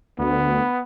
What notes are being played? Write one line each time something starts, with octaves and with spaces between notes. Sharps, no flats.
D2 B3